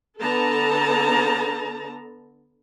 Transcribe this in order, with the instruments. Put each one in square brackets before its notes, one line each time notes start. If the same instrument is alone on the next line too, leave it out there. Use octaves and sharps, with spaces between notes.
[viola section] D3 B3 A4 A5 A#5